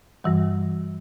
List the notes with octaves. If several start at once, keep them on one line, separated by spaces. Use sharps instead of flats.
G2 E3 G3